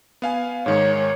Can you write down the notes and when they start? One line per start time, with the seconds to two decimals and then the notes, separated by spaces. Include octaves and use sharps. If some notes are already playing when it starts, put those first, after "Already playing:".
0.22 B3 F5 G#5
0.66 G#2 D#3 G#3 C#5